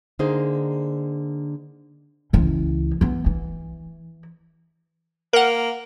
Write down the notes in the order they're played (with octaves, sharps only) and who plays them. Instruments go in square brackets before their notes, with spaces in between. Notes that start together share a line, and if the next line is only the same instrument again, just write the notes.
[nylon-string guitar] D3 A#3 D#4 G#4 C5
[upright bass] C#2 E3
E3 B3
E3
[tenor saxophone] A#3 [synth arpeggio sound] A#4 F#5